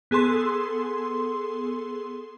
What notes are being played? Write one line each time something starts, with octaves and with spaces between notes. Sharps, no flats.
B3 G#4 A4 C6